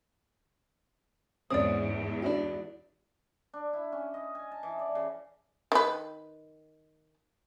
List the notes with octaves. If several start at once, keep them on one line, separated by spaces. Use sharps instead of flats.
E2 G#2 C4 C#4 D5 D#6
D4 E4 F#4
D4
E4
C#4
D#5
G#5
A5
E3
D5
C#3
D#3 B4